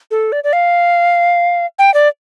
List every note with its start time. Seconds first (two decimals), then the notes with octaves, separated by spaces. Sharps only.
0.11 A4
0.32 D5
0.44 D5
0.53 F5
1.79 G5
1.94 D5